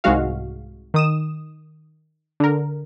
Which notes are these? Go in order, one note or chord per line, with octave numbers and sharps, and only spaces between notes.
C2 G#2 G#3 F#4 F5
D#3 D#6 E7
D3 A#4